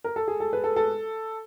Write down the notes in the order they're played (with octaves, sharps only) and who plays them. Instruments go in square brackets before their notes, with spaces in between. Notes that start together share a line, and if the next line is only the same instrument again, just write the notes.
[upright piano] A#4
A4
G#4
A4
B4
A4
A4